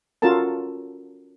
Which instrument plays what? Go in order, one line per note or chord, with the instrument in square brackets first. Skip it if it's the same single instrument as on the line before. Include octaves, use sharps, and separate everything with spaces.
[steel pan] C#4 F4 F#4 A4 A#4 A5